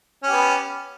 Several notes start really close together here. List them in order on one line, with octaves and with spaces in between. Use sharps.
C#4 G4 B3